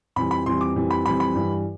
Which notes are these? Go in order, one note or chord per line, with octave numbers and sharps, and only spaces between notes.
F2 E3 G3 B5
B5
F2 E3 G3 C6
D6
F2 E3 G3
B5
F2 E3 G3 B5
B5
G2 E3 G3